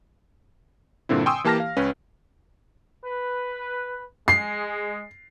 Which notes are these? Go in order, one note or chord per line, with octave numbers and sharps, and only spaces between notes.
G2 A#2 D3 C4 E4
G5 G#5 C6 C#6 D#6 E6
E3 A#3 G4 A5 F6 A#6
F5
C#2 C#4 B4
B4
G#3 C7